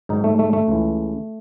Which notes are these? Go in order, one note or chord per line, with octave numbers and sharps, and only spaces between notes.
G#2 D#3 F#3 D#4
A3
A3
A3
C#2 C#3 E3